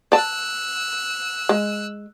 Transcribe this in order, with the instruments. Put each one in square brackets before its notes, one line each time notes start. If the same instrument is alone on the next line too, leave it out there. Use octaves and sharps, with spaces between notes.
[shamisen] D5 A5 [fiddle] E6 F#6
[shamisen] G#3